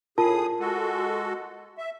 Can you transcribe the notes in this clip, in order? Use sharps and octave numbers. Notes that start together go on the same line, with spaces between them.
A2 F4 G#4 A#4 A5 D#6
G#3 F#4 A4
E5